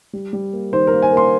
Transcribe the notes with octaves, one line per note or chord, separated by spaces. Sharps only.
G3
G3
A#3
D#3 C5
A#4
A#3
G#5
A#3 C6